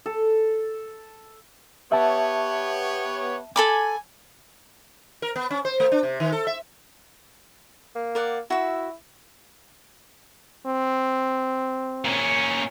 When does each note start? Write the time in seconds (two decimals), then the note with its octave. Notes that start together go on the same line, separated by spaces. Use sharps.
0.06 A4
1.92 B3 G4 C#5 E5 A5
3.56 A4 G#5 B5 D6
5.22 A#4
5.36 B3
5.51 C#4
5.65 C5
5.80 A3
5.92 D4
6.03 C3
6.20 D#3
6.32 A4
6.47 E5
7.95 A#3
8.15 A#4 D5 F#5
8.50 E4 F#4 E5
10.66 C4
12.05 A#2 C#4